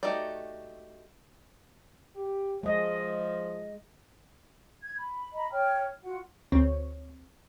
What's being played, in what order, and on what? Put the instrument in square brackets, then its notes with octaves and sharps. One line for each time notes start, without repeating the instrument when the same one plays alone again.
[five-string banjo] A3 D#4 F#4 G4 D5
[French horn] G4
[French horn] F3 [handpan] G#3 D#5
[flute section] G#6
B5
D#5 A#5 B5
C#5 G5 F6
F4 F#4 F#5
[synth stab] D2 C4 C#5